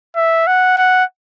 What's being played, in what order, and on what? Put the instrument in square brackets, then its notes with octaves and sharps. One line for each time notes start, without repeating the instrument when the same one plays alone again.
[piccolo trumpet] E5
F#5
F#5